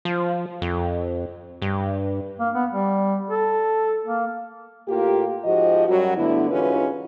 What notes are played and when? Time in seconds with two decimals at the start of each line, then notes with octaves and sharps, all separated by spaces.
0.05 F3
0.62 F2
1.62 G2
2.40 A#3
2.55 B3
2.72 G3
3.30 A4
4.05 A#3
4.88 A2 A#3 F4 G4
5.45 G#2 F3 F#4 G4 D#5
5.88 F#2 F#3 G3 F#4
6.17 G2 D3 A3 B3 E4
6.50 G#2 E3 C#4 F4 F#4 B4